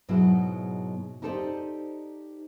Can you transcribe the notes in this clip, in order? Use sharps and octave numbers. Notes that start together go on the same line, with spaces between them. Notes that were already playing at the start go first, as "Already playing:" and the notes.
G#2 B2 F#3 G#3 E4
D#4 G4 A4 C5 D5 D#5